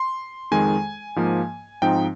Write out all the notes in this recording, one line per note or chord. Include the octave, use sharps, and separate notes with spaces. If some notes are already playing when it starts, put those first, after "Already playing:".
Already playing: C6
F2 D#3 G#3 G#5
G#2 F3 A#3
G#2 F3 C4 D#4 G5